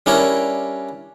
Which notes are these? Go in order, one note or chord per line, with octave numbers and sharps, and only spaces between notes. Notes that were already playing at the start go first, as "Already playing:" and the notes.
G3 C#4 D4 E4 A#4 C#5